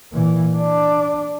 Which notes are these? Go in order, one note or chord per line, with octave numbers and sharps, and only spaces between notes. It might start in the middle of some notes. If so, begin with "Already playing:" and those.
A#2 E3
D4